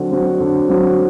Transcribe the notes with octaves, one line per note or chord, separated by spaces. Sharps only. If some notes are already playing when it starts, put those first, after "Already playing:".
Already playing: D3 F#3 C4 F#4
F#3 C4 F#4
D3
F#3 C4 F#4